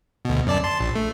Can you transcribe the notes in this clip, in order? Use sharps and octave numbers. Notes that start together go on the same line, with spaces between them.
D2 B2
F#2 D5 A5
A5 C6
A#1
A3